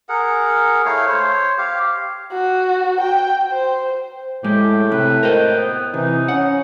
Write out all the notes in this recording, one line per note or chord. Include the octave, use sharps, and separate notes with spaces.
G#4 A#4 F#5
A3 E4 C#5 F5
C5 C#5
G4 F5
F#4
G5
C5
A2 G#3 G4
C3 B4
A#4 C5 D#5 G5
B3
C3 E3 D#4
C#4 F#5